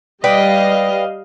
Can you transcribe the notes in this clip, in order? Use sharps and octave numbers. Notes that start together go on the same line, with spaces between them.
G3 B4 D5 D#5 F5 G5